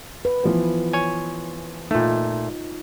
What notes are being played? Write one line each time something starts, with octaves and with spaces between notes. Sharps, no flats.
B4
E3 F3 B3
C#5 G#5
A#2 A3 D#4 F4